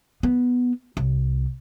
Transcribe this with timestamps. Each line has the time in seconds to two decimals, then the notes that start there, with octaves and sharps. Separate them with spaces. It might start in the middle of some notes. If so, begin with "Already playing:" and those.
0.23 B3
0.97 C2